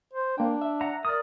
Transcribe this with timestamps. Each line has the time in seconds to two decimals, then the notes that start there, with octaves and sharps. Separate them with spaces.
0.13 C5
0.38 A#3 D4 G5
0.61 E5
0.81 F#5 A#5
1.05 A#4 D5 D#6